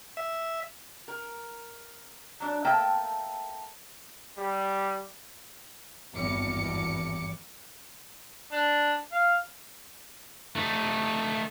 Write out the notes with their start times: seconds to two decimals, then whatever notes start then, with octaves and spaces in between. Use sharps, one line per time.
0.17 E5
1.08 A#4
2.40 F#3 D4
2.65 A3 A#3 A4 E5 G5
4.38 G3
6.14 G#1 E2 G2 D6 C#7
8.52 D4
9.12 F5
10.56 A3 D#4